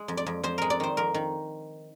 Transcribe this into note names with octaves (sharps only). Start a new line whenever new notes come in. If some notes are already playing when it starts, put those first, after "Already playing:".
Already playing: G#3
F2
D5
F2
F2 C5
G#3 A#4
D5
D#3 C5
F2 A#4
D#3